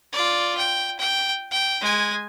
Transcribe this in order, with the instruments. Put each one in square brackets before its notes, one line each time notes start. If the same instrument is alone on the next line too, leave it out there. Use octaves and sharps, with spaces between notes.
[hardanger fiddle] F4 D5
G5
G5
G5
G#3 G#5